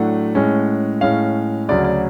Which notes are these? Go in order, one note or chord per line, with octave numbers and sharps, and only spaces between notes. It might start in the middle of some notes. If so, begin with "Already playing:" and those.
Already playing: A2 F#3 A3 D4 F#5
A2 G#3 C#4
A2 G#3 C#4 F5
D2 C#3 F#3 C#4 D5
D5